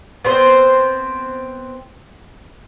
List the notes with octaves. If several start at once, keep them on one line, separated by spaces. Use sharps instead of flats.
B3 C4 C5